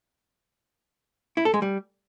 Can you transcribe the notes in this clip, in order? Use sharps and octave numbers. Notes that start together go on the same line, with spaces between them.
E4
A4
G#3
G3